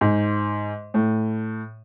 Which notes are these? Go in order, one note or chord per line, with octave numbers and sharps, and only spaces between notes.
G#2
A2